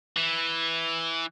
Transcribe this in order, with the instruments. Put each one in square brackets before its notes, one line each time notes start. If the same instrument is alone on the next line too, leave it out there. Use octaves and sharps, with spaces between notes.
[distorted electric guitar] E3